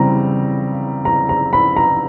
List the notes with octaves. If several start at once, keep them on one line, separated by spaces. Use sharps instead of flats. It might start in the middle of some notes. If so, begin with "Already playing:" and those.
Already playing: C#3 E3 G3 C4 A#5
A#5
A#5
B5
A#5